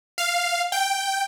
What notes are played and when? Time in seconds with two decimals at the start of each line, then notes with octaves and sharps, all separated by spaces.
0.18 F5
0.72 G5